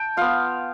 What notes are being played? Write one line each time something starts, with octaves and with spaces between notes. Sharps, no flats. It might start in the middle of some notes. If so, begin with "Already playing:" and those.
Already playing: G5 A5
B3 F4 F5